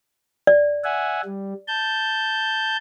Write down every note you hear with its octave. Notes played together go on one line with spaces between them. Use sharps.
D5
E5 F#5 G#5
G3
A5 G6